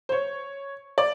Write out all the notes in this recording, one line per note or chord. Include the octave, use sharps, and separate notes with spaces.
C5
C#5
D5